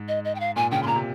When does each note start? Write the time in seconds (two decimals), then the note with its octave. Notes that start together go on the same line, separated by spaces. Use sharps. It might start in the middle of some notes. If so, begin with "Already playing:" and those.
Already playing: G#2
0.08 D#5
0.24 D#5
0.35 G5
0.40 F5
0.56 A#2 G#5
0.71 C#3 G5
0.83 C6
0.86 A#2 A#5
0.96 C3